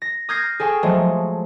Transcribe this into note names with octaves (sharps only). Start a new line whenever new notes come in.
A#6
D#6 F6 G6 G#6 A#6 C7
G#4 A4 G5 G#5 C#6
F3 F#3 G#3 A3